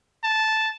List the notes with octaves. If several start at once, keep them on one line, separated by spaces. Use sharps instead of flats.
A5